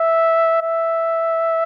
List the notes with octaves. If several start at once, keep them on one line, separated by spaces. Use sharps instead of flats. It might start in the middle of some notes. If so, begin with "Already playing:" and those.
Already playing: E5
E5